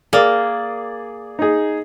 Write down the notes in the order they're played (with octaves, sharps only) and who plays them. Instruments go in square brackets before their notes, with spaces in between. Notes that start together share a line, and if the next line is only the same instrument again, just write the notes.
[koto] A#3 [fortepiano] G#4 D5
[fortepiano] D#4 G#4